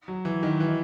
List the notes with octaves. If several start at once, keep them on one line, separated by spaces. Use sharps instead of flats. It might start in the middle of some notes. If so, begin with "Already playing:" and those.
F#3
E3
D#3
E3